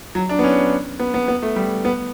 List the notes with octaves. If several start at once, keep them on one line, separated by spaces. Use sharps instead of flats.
F#3
D4
B3
C#4
B3
B3
B3
A3
G3
B3